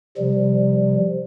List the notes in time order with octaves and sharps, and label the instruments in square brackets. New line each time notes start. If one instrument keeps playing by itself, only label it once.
[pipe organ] C3 F3 G3